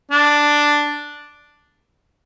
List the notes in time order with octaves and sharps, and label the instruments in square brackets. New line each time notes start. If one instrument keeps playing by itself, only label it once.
[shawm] D4